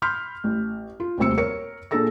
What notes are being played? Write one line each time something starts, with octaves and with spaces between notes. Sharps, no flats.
B5 C6 F6 G6 B6
A1
F4
D#1 D2 C3 C4 E6 C#7
A#4 C#5 C#7
A#2 D4 G#4 A4 E6 A#6